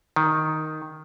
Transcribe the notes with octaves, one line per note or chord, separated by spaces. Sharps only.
D#3